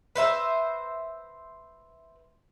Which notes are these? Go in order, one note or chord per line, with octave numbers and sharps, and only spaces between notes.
B4 C5 E5 A#5